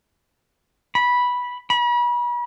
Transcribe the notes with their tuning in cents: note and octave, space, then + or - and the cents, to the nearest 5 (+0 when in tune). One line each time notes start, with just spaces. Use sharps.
B5 -10
B5 -40